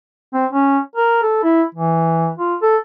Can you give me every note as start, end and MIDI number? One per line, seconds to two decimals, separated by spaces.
0.33 0.46 60
0.52 0.79 61
0.95 1.22 70
1.22 1.42 69
1.43 1.63 64
1.75 2.31 52
2.38 2.55 65
2.62 2.77 69